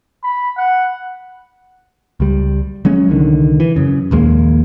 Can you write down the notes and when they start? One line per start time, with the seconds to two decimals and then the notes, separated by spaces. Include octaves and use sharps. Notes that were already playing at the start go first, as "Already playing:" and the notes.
0.23 B5
0.57 F#5
2.20 C#2 G3
2.85 F#3 G#3 C#4
3.08 C2 D3 D#3
3.60 E3
3.76 F#2 C#3
4.11 A#1 D#2 G#3 A#3